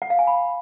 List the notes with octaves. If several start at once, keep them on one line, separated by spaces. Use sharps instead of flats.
F#5
F5
G#5
B5